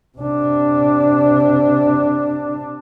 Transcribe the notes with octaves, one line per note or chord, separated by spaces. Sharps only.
C3 D4